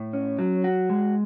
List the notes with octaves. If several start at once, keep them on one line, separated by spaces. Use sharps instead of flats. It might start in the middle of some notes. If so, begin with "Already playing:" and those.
Already playing: A2
C#4
F#3
F#4
G#3